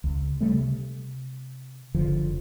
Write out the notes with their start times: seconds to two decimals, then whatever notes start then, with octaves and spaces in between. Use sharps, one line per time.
0.04 C#2
0.41 C#3 G3 A3
0.57 C3
1.94 F#1 D3 F3